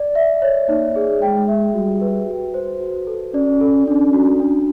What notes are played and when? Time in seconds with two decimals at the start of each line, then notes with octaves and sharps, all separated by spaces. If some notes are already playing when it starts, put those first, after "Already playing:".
Already playing: D5
0.15 E5
0.42 C#5
0.69 A#3 D#4
0.96 G#4
1.21 G#3 G5
1.48 E5
1.74 G3 F#4
2.01 B4
2.27 F#4
2.54 C5
2.80 F#4
3.07 A4
3.34 C#4 D5
3.61 A4
3.86 C#4 D4
4.13 F#4
4.40 D4